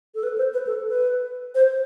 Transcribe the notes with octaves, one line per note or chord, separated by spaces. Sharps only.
A4
B4
C5
B4
A4
B4
C5